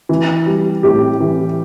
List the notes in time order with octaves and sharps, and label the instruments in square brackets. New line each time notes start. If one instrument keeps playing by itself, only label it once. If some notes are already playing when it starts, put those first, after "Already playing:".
[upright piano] E3
G3
A2 G4
E3